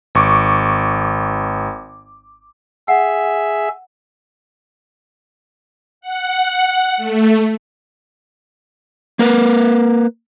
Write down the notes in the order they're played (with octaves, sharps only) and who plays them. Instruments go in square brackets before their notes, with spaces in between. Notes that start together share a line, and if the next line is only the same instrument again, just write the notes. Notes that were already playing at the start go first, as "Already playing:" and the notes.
[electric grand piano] G#1 C#6 D6
[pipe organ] G#4 E5 [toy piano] F#5
[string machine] F#5
A3
[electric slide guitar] A#3 A#4 B4